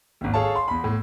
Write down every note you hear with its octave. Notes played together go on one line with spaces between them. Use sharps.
G#1 D#2
G#4 A4 C#5 F5 A5
C6
E2 B5
A2